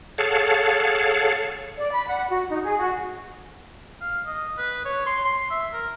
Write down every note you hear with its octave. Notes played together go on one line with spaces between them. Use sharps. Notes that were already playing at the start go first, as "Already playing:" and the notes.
G#4 A4 C#5 F5 F#5 A5
D5
B5
F#5
F#4
D#4
G#4
F#4
F5
D#5
B4
C#5
C6
C6
E5
A#4